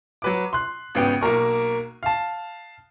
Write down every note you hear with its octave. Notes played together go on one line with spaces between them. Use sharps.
F#3 B4 D6
C6 F#6
G#1 C#3 B3 G5
B1 A#3 A#4 C#6
F5 A5